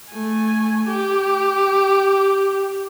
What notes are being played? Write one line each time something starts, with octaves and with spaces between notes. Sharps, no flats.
A3 G#5
G4